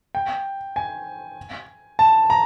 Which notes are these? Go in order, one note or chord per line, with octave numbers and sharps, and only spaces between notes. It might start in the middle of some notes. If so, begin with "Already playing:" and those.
G5
G#5
A5
A#5